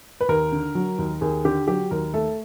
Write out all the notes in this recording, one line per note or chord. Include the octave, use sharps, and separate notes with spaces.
B4
D#2 A#4
D3
F#3
D#2
D#2 G#4
D3 G4
F#3 G4
D#2 A#4
A3 A4